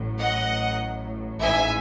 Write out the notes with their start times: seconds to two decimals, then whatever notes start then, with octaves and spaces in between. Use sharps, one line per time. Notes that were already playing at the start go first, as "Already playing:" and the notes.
Already playing: A1 A2 F#3
0.18 D#5 F#5
1.41 A1 G#2 E3 E5 G#5